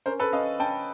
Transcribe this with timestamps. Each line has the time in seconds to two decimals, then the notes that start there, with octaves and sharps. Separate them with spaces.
0.06 C#4 A#4 C5
0.20 A4 B4
0.33 C#4 D#5 F5
0.60 C#4 G5 A5